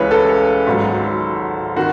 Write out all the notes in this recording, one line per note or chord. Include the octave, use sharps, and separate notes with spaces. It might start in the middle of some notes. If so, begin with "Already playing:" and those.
Already playing: C#2 C#3 E3 G#3 B4 C#5
A4
G#1 G#2 F#3
D#3 F#4